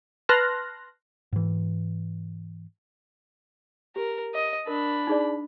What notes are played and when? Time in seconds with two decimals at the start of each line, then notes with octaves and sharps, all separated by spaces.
0.29 B4 A5 C6 F6 F#6 A#6
1.33 G#2 E3
3.96 G4 A#4
4.34 D#5
4.67 D4 A#4 B5
5.07 D#4 G#4 D5